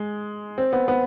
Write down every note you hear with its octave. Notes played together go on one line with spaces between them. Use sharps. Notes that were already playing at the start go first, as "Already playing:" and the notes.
Already playing: G#3
C4
B3
B3